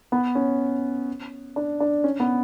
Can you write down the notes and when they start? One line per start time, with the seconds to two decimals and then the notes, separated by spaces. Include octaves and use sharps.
0.12 B3
0.35 C#4
1.56 D4
1.80 D4
2.04 C#4
2.20 B3